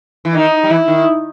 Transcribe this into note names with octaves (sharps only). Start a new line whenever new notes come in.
E3
D#3 D#4
G3
E3 E4
D#3